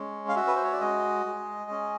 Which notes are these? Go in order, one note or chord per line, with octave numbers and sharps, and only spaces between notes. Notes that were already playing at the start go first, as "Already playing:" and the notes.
Already playing: G#3 C#4
F5
F#4 E5
B4
C5
C#5
D5
G#3 D#5
G#3
C#4